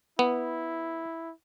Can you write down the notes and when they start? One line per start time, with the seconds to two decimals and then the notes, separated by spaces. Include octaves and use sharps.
0.19 B3 E4